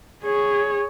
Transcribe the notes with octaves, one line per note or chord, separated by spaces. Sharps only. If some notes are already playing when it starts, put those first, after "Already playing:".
G#4 C#5